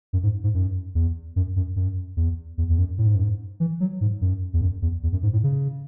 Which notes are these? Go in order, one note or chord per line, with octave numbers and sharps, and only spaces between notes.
F#2
G#2
G#2
F#2
E2
F#2
F#2
F#2
E2
E2
E2
F#2
A2
G#2
F#2
G#2
E3
F#3
G#2
F#2
E2
F#2
E2
E2
F#2
G#2
A2
C#3